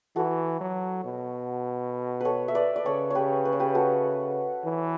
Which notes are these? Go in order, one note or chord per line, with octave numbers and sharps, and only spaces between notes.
E3 F#4 A4
F#3
B2
A4 B4 C#5
E5
B4 D5
D5
C#3 A4 C#5
G4 B4 C#5
B4
C#5
G4 B4
F#4 A4
E3